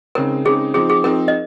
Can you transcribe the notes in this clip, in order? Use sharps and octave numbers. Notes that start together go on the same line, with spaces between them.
C#3 G#3 C4 D#4 A#4
C#3 G#3 C4 D#4 G#4
F3 C4 D#4 G#4
G#4
F3 C4 D#4 A#4
D#5